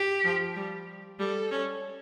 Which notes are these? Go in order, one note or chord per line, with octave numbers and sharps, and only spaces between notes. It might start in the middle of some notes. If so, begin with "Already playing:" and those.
Already playing: G4
F3
G3
G3 A4
C#4